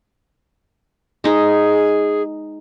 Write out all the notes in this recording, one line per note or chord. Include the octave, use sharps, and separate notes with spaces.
G#3 D#4 G#4